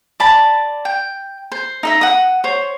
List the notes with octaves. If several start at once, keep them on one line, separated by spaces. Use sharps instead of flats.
D5 A5 B5
G5
C5
D#4 D#5 E5
F#5 D#6
C5 C#5